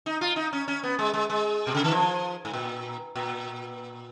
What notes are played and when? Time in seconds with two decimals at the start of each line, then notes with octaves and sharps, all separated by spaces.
0.06 D#4
0.21 F4
0.36 D#4
0.53 C#4
0.68 C#4
0.83 B3
0.99 G#3
1.14 G#3
1.30 G#3
1.67 B2
1.75 C#3
1.84 D#3
1.91 F3
2.45 G#2
2.53 A#2
3.16 A#2